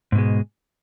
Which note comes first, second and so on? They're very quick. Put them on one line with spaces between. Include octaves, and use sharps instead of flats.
G#2 B2 G#3